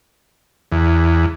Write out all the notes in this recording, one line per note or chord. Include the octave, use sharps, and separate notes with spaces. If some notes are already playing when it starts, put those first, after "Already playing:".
E2